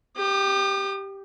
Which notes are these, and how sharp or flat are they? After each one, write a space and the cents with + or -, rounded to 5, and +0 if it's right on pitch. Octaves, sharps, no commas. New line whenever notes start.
G4 +0 D6 +45